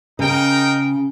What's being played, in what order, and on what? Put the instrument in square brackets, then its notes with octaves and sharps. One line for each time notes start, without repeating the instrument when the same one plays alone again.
[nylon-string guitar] C#3 [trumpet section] D#4 A#4 G5